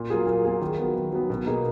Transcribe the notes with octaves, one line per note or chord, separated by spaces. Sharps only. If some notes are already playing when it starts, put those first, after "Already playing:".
Already playing: A#2
F#3 A#3 F4 G#4
A#2
F#3 A#3 F4 G#4
D#3
F#3 B3
D#3
F#3 B3
B2
A#3 D#4 G#4 B4